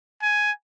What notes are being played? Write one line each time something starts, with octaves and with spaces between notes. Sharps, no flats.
G#5